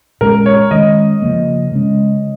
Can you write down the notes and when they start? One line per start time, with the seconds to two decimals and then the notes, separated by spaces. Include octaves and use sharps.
0.21 A#2 G#3 C#4 A#4
0.46 C#5
0.71 D#3 G#3 C#4 D#5
1.22 C#3 F3 A#3
1.72 C#3 G#3 C#4